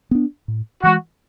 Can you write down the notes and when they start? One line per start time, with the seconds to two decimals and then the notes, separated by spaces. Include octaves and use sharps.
0.11 B3 D4
0.48 A2
0.83 E3 G#3 F#4